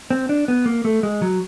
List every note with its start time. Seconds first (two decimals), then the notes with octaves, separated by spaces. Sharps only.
0.11 C4
0.29 D4
0.48 B3
0.66 A#3
0.85 A3
1.03 G#3
1.22 F#3